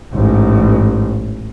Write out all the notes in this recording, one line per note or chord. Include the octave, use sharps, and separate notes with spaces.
A1 G#2